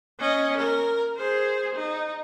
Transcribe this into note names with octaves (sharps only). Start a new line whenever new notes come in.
C#4 D#5
A#4
G#4 C5
D#4